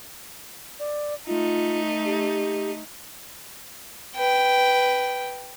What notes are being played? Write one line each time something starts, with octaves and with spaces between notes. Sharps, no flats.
D5
A3 D#4 F4
G4
B4 G5